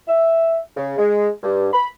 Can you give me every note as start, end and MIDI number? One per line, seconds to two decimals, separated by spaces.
0.07 0.59 76
0.76 0.96 49
0.98 1.29 56
1.43 1.68 43
1.73 1.87 83